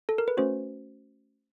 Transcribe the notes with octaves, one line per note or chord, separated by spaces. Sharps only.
A4
A#4
B4
A3 C#4 F#4 C5